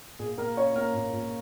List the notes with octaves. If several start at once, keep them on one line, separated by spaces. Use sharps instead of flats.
A#2 G#4
A#2 A#3 A#4
C#4 F4 C#5
A#3 A#4
A#2
A#2